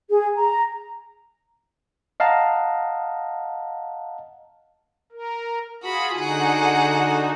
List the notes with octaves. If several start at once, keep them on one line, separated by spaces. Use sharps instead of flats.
G#4
A#5
D#5 F5 F#5 A5 A#5
A#4
F4 F#4 G#4 B5
D3 D#4 F#4 G#4 F#5